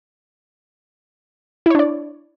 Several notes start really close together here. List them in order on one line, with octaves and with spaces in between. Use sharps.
E4 C#5 D4 D5